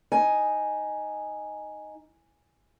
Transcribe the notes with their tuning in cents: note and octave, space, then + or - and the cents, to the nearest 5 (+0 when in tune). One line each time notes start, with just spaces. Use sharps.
D#4 +0 G#5 +0